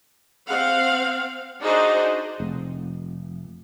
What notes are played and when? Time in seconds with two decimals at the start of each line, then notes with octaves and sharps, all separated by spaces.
0.46 C4 F5 F#5
1.61 D4 D#4 F#4 G#4 C5 D#5
2.40 F1